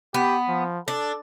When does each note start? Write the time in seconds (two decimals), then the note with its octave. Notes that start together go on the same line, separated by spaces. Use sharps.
0.14 B3 G4
0.48 F3
0.88 D4 A4